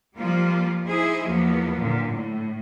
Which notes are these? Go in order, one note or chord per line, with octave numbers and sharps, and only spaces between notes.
F3 G3 A#3 F4
D#4 E4 G#4 C5
E2 F3 F#3 A#3 B3
A#2 D3
A2